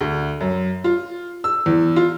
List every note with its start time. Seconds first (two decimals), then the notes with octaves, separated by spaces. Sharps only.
0.01 D2
0.41 F#2
0.84 F4
1.44 E6
1.66 E2
1.96 F4